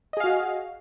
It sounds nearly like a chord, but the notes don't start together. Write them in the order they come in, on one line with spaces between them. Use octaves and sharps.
D#5 G#4 F5 F#4